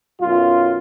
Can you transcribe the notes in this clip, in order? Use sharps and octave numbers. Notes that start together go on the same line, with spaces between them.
B1 F#2 F4